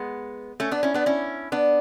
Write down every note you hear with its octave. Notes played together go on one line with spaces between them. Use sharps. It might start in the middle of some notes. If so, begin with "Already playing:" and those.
Already playing: G#3 B3
A3 C#4
B3 D4
C#4 E4
B3 D4
C#4 E4
B3 D4